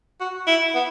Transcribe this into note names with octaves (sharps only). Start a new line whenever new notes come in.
F#4
E4
B3